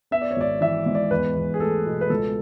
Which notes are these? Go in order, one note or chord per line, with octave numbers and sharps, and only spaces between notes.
B3 E5
D5
C#5
G#1 D5
E3 E5
G#2
D5
E2 B4
E2
G#4
A3 A4
B2
B4
C#2 A4